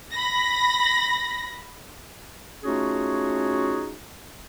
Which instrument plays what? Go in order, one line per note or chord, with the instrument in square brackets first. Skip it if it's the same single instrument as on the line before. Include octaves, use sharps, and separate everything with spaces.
[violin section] B5 A#6
[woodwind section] A3 C#4 D#4 F4 F#4 G#4